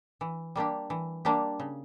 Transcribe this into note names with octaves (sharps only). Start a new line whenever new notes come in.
E3
G3 A#3 D4 G4
E3
G3 A#3 D4 G4
C#3